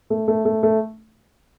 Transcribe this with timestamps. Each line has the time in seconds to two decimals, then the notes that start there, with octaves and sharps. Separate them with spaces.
0.10 A3
0.28 A3
0.45 A3
0.63 A3